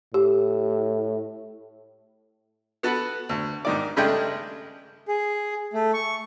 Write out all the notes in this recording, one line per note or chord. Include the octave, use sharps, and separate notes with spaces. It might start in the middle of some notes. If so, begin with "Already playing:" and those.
A2 G4
B3 F#4 A4 B4
D2
G#2 D#3 D5
G2 C#3 G#3 A3 D4 G5
G#4
A3
C#6